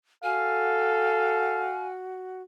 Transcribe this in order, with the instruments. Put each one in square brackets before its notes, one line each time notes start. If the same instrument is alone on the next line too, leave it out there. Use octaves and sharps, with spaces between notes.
[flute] F#4 [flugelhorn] A4 [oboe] F5 [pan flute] G#5